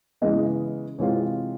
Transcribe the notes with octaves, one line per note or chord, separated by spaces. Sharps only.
C#3 E3 G#3 B3 D#5
C3 E3 G#3 C4 F4 C#5